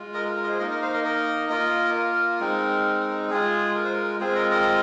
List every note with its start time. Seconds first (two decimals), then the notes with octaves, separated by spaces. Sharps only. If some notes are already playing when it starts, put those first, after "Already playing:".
Already playing: G#3 F4
0.14 A#4 D#5
0.26 A#4
0.37 A#4
0.44 D#5
0.48 G#4 C5
0.59 A#3 D#4 A#4 D#5
0.70 A#4 D#5
0.82 C5 F5
0.93 A#4 D#5
1.05 A#4 D#5
1.49 A#3 F4 A#4 D#5
1.95 A#4
2.40 G#3 C4 D#4
3.30 G#3 F4 G#4
3.75 A#4
3.84 C5
3.94 A#4
4.20 G#3 C4 F4 G#4 C5
4.35 A#4 D#5
4.51 A#4 D#5